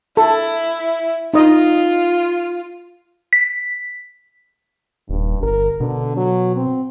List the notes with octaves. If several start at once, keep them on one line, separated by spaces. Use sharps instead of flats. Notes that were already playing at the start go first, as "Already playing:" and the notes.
E4 A4
D#4 F4 D#5
B6
D#1 G2
G1 A#4
B2 D3
F#3
C4